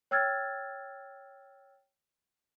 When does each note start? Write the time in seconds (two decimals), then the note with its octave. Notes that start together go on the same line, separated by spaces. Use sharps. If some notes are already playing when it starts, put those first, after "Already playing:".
0.11 C#5 G5 E6 F6 G#6 A6